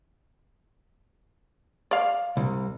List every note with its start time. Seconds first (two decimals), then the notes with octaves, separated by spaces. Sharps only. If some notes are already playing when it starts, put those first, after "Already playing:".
1.91 D5 F5
2.37 C2